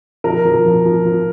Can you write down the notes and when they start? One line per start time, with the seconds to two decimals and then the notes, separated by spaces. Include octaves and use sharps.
0.24 F3 A#4
0.45 F3
0.65 F3
0.85 F3
1.06 F3